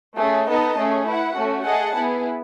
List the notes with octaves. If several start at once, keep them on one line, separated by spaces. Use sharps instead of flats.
A3 C#4 G#4
B3 D#4 A4 D#5 A5
A3 C#4 G#4
E4 B4 F#5
A3 C#4 F#4
G#4 D#5 F#5 A5
B3 E4 G#4